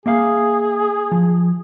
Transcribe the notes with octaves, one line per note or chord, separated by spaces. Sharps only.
A#3 G#4 E5 F5
F3